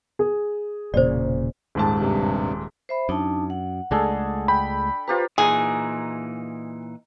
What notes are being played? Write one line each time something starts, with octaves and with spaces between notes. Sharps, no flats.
G#4
E1 A#2 C#3 C5 D5
D#1 G#2 A5
G2 C3
C5 E5 B5
F#2 D4 D#4 A5
F#5
C#2 G#3 A3 D4 G#4 A4
G5 B5
F4 G4 B4 C5 A#5
A#2 E3 D#4 G#4